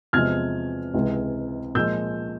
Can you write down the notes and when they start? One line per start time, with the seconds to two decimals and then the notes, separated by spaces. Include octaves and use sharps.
0.13 E2 C3 F3 G#3 F6 G#6
0.94 C#2 C3 E3 G#3
1.75 A#2 F3 G#3 E6 G6